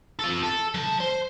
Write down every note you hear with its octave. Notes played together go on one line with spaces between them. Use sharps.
F4 A4
A4
F#3 A5
C5